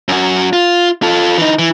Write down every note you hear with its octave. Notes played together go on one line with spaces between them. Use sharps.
F#2 F#4
F4
F4 A4
E3 D#4
E3